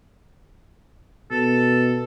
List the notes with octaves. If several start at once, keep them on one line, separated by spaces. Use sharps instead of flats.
B2 A4